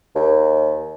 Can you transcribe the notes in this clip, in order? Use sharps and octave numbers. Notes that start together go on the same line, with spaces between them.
D#2